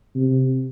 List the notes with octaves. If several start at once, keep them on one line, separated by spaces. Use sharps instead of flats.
C3